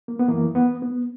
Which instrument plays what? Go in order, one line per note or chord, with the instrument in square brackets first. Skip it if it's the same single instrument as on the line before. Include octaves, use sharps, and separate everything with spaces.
[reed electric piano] A#3
B3
F#2 E3 A#3
B3
B3